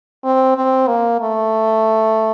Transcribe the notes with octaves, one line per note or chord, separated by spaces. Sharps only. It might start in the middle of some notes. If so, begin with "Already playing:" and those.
C4
C4
A#3
A3